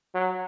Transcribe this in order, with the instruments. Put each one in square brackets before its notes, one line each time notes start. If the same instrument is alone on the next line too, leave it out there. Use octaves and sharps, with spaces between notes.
[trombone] F#3